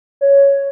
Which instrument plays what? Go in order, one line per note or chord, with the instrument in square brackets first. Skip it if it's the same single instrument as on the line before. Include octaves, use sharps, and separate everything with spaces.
[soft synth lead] C#5